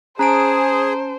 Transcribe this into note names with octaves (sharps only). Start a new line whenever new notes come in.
C#4 G#4 C5 A5 A#5 D7